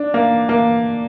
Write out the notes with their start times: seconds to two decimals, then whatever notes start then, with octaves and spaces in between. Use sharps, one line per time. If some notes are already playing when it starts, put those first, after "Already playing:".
Already playing: D4
0.14 A#3
0.49 A#3